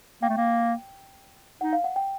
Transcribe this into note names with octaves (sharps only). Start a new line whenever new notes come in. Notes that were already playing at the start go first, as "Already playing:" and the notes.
A#3 G5
A3
A#3
D#4 F#5
F5
F#5
G5